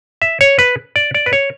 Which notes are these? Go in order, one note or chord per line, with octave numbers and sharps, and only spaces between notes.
E5
C#5
B4
D5
D5
B4
C#5